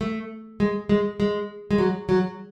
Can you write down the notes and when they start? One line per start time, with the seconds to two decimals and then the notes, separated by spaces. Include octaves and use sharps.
0.01 A3
0.60 G#3
0.89 G#3
1.20 G#3
1.71 G#3
1.78 F#3
2.09 F#3